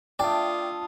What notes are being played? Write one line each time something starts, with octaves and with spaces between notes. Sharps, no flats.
A3 D4 F4 D5 G5 D#6